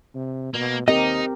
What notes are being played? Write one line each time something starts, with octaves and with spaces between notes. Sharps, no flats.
C3
B2 A#3
D#2 C4 D#4 G4 A#4 D#5